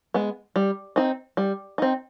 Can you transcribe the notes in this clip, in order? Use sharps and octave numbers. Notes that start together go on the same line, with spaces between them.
G#3 B3
G3
C4 D#4
G3
C4 D#4